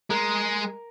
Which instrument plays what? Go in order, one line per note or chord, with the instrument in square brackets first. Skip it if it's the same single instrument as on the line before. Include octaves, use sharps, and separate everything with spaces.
[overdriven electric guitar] G#3 [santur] A#4